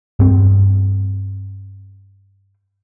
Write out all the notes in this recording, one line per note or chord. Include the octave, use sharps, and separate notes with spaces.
G2 C4